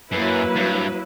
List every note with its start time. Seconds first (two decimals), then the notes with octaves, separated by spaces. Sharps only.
0.12 F#2 F#3 A#3 E4 B4
0.56 G2